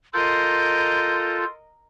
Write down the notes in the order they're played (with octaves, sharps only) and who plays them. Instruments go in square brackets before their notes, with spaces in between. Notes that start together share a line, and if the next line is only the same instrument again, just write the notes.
[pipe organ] F4 A4 [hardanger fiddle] A#4 D#5 [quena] C6 [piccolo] G6